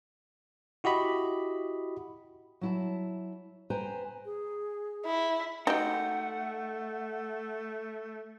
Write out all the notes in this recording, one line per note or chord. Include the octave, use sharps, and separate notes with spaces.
E4 F#4 G4 D#5 B5
F#3 E4 A5
B4 C5 G5 G#5 A#5
G#4
E4
G#3 A3 D#4 F#4 G4 F#5 G5